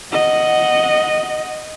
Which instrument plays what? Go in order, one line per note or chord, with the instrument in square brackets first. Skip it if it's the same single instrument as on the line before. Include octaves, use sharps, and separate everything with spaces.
[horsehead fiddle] D#5 F#5